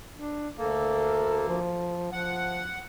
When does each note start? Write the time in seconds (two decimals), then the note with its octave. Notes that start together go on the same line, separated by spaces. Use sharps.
0.14 D4
0.58 D2 A#3 A4
1.48 F3
2.12 F3 F#5